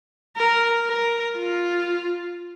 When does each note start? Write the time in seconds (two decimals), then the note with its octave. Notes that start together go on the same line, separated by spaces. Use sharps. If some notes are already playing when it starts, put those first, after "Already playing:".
0.36 A#4
0.87 A#4
1.36 F4